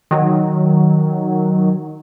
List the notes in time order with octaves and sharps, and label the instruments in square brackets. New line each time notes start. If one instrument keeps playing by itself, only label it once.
[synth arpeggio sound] D#3 F#3